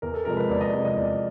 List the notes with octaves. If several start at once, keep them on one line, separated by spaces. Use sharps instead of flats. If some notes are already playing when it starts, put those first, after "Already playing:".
E2 A#4
A4
C3 F3 G#3 A#4
B4
E2 D5
D#5
C3 F3 G#3
D#5
E2 D5